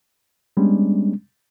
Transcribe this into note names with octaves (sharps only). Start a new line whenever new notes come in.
G3 G#3 B3 C#4 D4